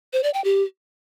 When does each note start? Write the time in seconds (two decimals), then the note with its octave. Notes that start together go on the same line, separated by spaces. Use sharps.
0.13 C5
0.23 D5
0.34 G5
0.44 G4